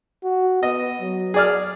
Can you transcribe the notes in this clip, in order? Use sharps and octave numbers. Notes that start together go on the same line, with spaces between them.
F#4
B3 D#5
F#3
G#4 D5 F6